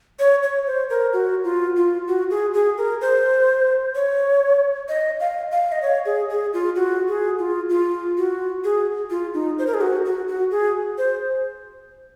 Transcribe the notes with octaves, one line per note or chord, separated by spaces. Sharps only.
C#5
C#5
C5
A#4
F#4
F4
F4
F#4
G#4
G#4
A#4
C5
C#5
D#5
F5
F5
D#5
C#5
G#4
G#4
F4
F#4
G#4
F4
F4
F#4
G#4
F4
D#4
C5
A#4
G#4
F#4
F#4
F#4
G#4
C5